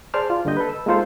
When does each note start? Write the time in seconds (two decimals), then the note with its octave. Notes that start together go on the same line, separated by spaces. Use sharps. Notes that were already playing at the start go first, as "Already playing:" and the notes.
0.14 G#4 C5 D5 A5 F6
0.30 F4
0.45 G2 D3 A#3 G4 D#5 G6
0.57 A4 B4
0.69 E6
0.86 G#3 A#3 D#4 F4 A4 C5